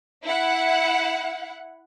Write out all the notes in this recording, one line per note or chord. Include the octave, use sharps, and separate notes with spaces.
E4 F#5